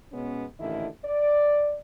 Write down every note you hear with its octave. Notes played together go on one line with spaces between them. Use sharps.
B2 G#3 B3 C#4
A1 A#2 D3 D#3 E4 E5
D5